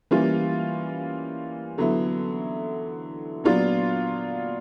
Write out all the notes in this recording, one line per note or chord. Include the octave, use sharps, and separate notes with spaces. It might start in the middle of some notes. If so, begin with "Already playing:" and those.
E3 G3 A#3 C#4 F4
D3 F#3 B3 E4
A#2 F#3 B3 D4 F4